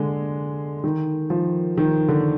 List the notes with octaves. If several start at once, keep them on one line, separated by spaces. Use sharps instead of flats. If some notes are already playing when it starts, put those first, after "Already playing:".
Already playing: D3 G#3
D#3
F3
D#3
D3